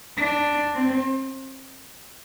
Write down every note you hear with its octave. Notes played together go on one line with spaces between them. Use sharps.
D4
C4